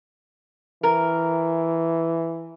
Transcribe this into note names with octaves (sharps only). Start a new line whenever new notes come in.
E3 A#4